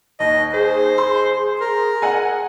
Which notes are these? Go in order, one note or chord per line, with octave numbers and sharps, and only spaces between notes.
D#2 D#5
G#4 C5
G#4 C6
A#4
F#5 G#5